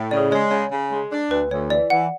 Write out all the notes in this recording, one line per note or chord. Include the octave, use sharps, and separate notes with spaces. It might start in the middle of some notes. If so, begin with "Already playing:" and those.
Already playing: A2
C#3 D5
G#3 C#5
C#3 C#5
C#3
G#3
D4
D2 B4
D2 C#5
E3 D5
E3 F#5